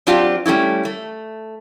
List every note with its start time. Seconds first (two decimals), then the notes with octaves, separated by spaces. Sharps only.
0.07 F#3 C4 D4 F4 G4
0.46 G3 A3 C#4 E4
0.85 A3